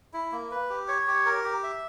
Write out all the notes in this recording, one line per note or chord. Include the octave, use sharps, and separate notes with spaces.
E4
A#3
B4
G4
C#5
G4
A#4
G4
E5